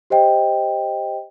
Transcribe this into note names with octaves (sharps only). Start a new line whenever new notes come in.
G4 C5 D#5 G5